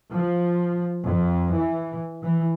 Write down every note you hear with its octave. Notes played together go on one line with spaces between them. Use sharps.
F3
F2
E3
E3